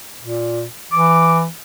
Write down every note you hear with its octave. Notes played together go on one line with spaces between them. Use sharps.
A#2
E3 D6